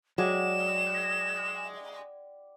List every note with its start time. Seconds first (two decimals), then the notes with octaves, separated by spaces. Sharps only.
0.18 F#3 G#3 D5 F#5 G5 E7